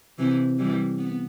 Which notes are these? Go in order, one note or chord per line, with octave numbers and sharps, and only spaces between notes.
C3 E3
E3 G3
B3